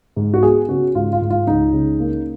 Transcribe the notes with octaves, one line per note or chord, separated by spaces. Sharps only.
G#2
F#4
B3 G#4
C#3 F#4
G#2 F4
F4
G#2
F4
C#2 D#4
C#3
A#3